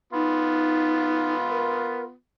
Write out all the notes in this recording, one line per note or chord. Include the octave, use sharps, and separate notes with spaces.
B3 D#4 F4
A#4